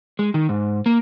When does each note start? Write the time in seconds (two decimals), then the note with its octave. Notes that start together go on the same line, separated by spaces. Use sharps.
0.19 G#3
0.34 D#3
0.49 G#2
0.86 A#3